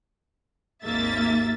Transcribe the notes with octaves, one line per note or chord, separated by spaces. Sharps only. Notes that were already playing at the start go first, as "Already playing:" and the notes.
G#1 D#2 A#3 E5 A6